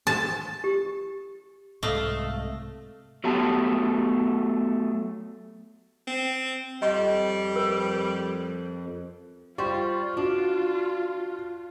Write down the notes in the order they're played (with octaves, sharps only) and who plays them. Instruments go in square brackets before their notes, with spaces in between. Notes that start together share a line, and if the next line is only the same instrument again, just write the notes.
[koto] A5
[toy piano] G4
[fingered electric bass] C2 G#2 C3 [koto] A3 [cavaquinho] D#5 F5
[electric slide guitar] F#3 A3 B3 G4 A5
[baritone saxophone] C4
[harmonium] F2 [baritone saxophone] G3 [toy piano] D#5 C6
[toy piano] A#4
[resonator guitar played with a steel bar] G3 C5 [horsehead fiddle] F4 [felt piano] C#6
[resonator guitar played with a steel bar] D4 [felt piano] F#4